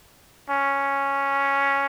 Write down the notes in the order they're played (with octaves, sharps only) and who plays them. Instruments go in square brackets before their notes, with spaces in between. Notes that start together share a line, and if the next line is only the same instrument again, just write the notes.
[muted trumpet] C#4